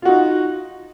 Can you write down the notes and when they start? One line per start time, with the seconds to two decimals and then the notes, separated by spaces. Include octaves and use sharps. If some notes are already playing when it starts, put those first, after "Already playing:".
0.02 F4
0.05 F#4
0.08 D#4